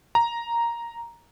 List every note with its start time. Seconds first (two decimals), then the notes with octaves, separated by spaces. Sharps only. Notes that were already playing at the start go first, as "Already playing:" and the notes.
0.15 A#5